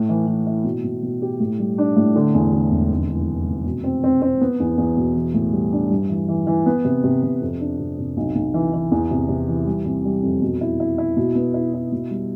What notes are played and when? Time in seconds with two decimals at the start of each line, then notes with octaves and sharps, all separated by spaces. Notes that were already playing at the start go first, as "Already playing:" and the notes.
Already playing: A2
0.09 E3
0.27 E3
0.47 E4
0.64 B2
0.84 B2
1.03 B2
1.22 G4
1.40 A2
1.59 G3
1.78 D4
1.96 A2
2.16 D3
2.34 E2
2.53 D3
2.71 E1
2.90 F1
3.10 E3
3.27 F1
3.47 F1
3.66 B2
3.84 C4
4.04 C4
4.22 C4
4.41 B3
4.60 E2
4.78 E2
4.97 B2
5.15 E3
5.34 A2
5.53 G3
5.72 D4
5.90 G2
6.10 E3
6.28 E3
6.47 E3
6.66 B3
6.84 C3
7.04 C3
7.23 C3
7.41 F2
7.60 D4
7.79 C3
7.98 C3
8.17 B1
8.35 B1
8.54 E3
8.73 E3
8.92 E2
9.11 C3
9.29 C3
9.48 E3
9.66 G3
9.86 C3
10.05 G3
10.23 F2
10.42 B2
10.61 E4
10.80 E4
10.98 E4
11.16 B2
11.35 B3
11.54 E4
11.74 E4
11.92 B2
12.11 G3